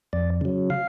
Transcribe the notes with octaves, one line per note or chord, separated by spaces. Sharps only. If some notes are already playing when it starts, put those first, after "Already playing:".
F2 D5
C#3 F#3
F5